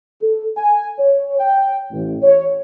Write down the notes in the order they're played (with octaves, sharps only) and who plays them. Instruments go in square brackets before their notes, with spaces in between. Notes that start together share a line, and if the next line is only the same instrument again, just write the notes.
[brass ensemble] A4
G#5
C#5
G5
A1
C#5